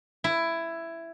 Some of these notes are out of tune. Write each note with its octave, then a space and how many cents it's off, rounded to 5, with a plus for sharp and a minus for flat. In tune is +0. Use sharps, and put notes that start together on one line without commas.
E4 +10